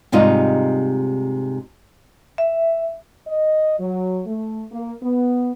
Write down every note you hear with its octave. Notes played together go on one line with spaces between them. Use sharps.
G#2 C3 G3 D#4 F4
E5
D#5
F#3
A3
A#3
B3